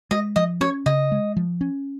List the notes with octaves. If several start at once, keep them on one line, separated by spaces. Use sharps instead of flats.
G#3 D#5
F3 D#5
C#4 C#5
C#3 D#5
G#3
F3
C#4